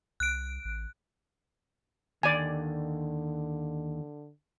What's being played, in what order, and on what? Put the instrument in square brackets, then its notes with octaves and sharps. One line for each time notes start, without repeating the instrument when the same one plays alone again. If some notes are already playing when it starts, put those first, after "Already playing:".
[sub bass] C2 [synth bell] F#6 D7
[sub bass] A1
[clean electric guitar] D#2 [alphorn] D3 [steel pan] D5 G#5